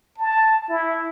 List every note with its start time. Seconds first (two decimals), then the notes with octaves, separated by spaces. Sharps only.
0.18 A5
0.70 E4